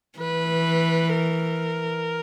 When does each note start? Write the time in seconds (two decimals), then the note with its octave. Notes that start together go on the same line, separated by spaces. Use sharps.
0.19 E3 B4
1.15 A#4